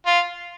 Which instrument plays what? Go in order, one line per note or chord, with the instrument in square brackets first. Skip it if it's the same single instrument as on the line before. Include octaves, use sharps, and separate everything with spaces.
[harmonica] F4